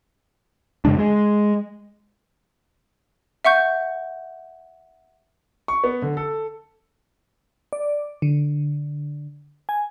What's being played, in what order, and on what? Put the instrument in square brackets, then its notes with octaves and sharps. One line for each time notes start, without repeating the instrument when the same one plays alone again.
[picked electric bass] F#2 C#3 G#3 D4
G#3
[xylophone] E5 F#5 C#6 G6
[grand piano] C#6
B3
D3
A4
[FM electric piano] D5
D3
G#5